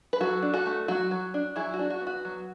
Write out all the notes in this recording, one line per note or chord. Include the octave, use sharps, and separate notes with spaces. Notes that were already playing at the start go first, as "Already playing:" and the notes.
B4
F#3 F#4 A4
D4
F#4 A4
A3
F#3 F#4
F#3
D4
F#3 E4 G#4
F#4
D4
F#4
B3
F#4
F#3